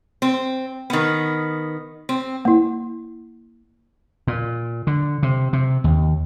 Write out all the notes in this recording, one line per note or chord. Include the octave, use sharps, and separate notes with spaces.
C4
D#3 B3
C4
A#3 E4
A#2
D3
C3
C3
D#2